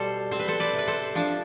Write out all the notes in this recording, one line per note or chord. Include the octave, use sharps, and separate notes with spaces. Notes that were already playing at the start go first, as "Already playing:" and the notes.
Already playing: B2 G3 A4 C5
C4 C5
B4
A4 C5
B4 D5
C3 B4
A4 C5
F3 D4